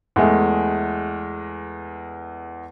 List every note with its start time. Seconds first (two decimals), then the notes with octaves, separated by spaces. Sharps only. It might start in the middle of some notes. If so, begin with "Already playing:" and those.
0.16 E2 G#3 A3